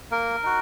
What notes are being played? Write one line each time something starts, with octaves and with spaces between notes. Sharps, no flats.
A#3 A#4
D#4 F#4